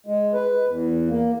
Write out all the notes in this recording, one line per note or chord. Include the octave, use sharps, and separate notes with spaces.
G#3
B4
E2
A#3